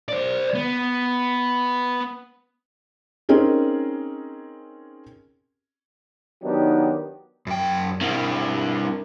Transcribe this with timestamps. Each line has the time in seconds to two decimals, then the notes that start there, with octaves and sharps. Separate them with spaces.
0.09 C5 D5
0.55 B3
3.29 C4 C#4 D#4 G#4 A#4
6.43 D#3 F#3 B3 D4 D#4 G4
7.47 F#2 G5
8.01 G2 C4 E4 A#4